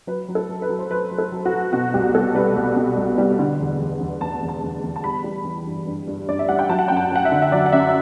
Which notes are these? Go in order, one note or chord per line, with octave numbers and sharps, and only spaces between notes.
F#3 B4
F#3
A4
F#3
B4
F#3
C5
F#3 B4
F#3
A4
F#3
F#4
F#3
B2 F#4
C2 G4
C2 A4
G3 B4
C2
B2
C2
G3
D3
E2
E2
E2
E2 A5
E2
A5
E2
E2
A5
G3 B5
G3
E3
G2
G2
G2
G2 D5
E5
G3 F#5
G5
F#3 A5
F#5
F#2 G5
A5
F#3 F#5
E5
D3
E5
F#3 D5
F#5
F#2 E5